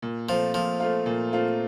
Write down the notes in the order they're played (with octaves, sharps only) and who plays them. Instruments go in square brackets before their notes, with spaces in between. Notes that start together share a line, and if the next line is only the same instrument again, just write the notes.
[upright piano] A#2
[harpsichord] F3 [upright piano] A3 C4 F4
[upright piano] A#2 [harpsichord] F3
[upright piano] A3 C4 F4
A#2
A3 C4 F4